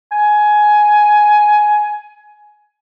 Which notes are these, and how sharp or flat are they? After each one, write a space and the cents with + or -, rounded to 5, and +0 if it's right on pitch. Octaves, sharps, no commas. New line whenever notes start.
G#5 +15